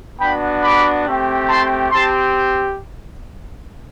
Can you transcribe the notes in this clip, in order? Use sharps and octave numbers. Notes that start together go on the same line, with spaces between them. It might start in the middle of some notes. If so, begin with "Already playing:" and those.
B3 D4 F#4 G5 B5
B5 D6
A3 C4 G4
A5 C6
C4 G4 A5 C6